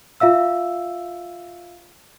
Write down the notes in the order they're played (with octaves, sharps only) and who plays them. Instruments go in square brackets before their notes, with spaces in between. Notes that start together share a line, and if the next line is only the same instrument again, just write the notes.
[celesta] F4 E5 F5 E6